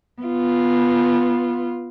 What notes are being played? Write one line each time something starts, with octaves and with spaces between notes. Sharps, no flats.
B3 F4